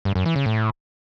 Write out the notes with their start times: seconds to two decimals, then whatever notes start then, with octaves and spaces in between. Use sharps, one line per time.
0.05 G2
0.15 F#2
0.26 E3
0.36 C#3
0.46 A2